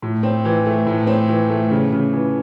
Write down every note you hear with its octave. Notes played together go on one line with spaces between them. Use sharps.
A2
C4
E3
A3
A2
C4
E3
A3
C#3
C#3
E3